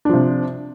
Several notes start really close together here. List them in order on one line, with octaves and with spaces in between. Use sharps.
D4 F3 C3